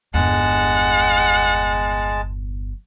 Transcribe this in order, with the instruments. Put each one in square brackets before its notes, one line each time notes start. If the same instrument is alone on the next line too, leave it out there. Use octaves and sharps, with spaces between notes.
[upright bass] G1 E2 [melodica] G#3 A5 [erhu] F#5